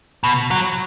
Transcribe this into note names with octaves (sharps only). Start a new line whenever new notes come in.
B2
F#3